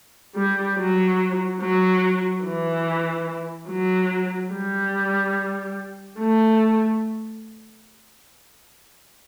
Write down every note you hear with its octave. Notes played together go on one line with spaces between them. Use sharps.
G3
F#3
F#3
E3
F#3
G3
A3